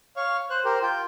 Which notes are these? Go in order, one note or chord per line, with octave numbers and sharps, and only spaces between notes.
C#5 F5 C#6
C5 F#6
G4 A#4 C5
F4 G5